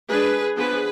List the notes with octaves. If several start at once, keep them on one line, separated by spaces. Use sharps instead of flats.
G#3 D4 G#4 B4
F3 B3 D4 G#4 B4